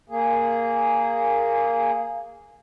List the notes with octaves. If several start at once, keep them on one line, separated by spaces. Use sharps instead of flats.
A#3 G#4